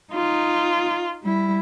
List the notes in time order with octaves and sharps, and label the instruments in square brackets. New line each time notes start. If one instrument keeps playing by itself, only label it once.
[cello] D#4 [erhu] F4
[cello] G3 E4